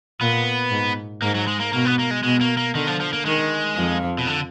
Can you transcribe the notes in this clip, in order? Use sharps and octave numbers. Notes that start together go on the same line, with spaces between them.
A#2 B3
G#2
G#2 A#3
F#3
G#3
A#3
B2 A#3
B3
A#3
G#3
B2 G#3
A#3
A#3
D3 D#3
F3
F3
A#3
D#3 G#3
F2 F3
B2
D3